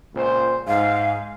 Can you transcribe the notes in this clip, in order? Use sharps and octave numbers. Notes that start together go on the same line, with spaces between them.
C#2 A#2 C5
G#2 F5